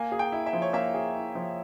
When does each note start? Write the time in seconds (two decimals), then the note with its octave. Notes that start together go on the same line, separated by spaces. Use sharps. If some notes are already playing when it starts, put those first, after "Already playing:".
Already playing: A#3 G#5
0.12 G#4
0.19 G5
0.32 E4
0.46 E5
0.53 F3
0.62 C#5
0.73 A#3 E5
0.94 G#4
1.15 E4
1.35 F3